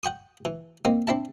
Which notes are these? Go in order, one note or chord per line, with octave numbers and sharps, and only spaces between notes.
F#5 G5 C#6 D#6
E3
A#3 C4 D#4
C4 D4 E4 A5